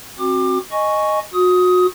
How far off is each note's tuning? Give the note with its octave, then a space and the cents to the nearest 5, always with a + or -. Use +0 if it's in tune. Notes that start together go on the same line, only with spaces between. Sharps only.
C4 +25 F#4 +0 D6 +25
D#5 -5 G#5 +0 C#6 +0
F#4 -30 D#6 +15